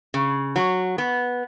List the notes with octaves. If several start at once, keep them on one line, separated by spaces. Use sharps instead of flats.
C#3
F#3
B3